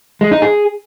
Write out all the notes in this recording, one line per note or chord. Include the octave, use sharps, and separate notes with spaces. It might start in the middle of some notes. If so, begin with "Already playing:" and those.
G#3
D#4
G#4